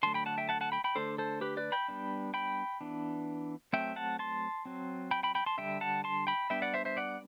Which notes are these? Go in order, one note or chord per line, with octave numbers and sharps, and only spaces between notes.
D3 F#3 A3 A5 C6
G5 B5
F#5 A5
E5 G5
F#5 A5
F#5 A5
G5 B5
G5 B5
D3 A3 D4 A4 C5
A4 C5
G4 B4
B4 D5
G5 B5
G3 B3 D4
G5 B5
E3 B3 D4
F#3 A3 C4 E5 G5
F#5 A5
A5 C6
F#3 C4
G5 B5
G5 B5
G5 B5
A5 C6
D3 G3 D4 E5 G5
F#5 A5
A5 C6
G5 B5
G3 B3 D4 E5 G5
D5 F#5
C5 E5
C5 E5
D5 F#5